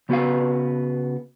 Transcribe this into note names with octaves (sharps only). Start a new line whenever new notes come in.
C#3 B3 F#4 G#4 B4 F5